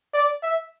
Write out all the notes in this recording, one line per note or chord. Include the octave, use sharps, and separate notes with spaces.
D5
E5